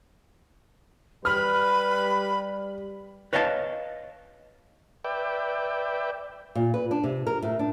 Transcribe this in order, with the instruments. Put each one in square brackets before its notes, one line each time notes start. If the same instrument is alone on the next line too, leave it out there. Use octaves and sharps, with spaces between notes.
[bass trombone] G3 [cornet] B4 [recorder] B5 [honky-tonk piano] F6
[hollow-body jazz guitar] B4 C#5 D#5 F5 G#5 A5
[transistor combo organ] B4 D5 E5 G5
[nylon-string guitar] A#2
B4
D4
C3
A#4
A2
D4